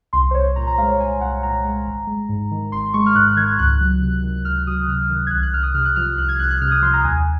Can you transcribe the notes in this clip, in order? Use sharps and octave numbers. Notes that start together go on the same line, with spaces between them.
C2 C6
C5
C2 C#5
A#2 A#5
A#5
G#3 F5
C#5
C2 G#5
C2 F#5
A#2 A#5
G#3
G#1
G#3
G#2
D#3
G#1 C6
G#3 C#6
F6
G#2 F#6
D#3 G#6
C#2 F#6
F#3
C3
D#3
C#2 F6
F#3 D#6
C3 F6
D#3
G#6
C2 F#6
F#6
C2 F6
D#6
C3 F6
F#6
F3 F6
C2 F#6
G#6
C2 F#6
F#6
C3 F6
D#6
F3 C6
A#5
D#2 G#5